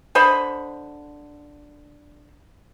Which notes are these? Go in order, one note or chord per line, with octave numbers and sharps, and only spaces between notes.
D3 C5 D#5 B5